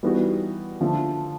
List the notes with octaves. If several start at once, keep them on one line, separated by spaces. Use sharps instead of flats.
E3 G3 B3 D#4 F#4
D3 F3 A3